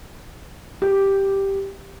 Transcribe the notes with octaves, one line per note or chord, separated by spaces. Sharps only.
G4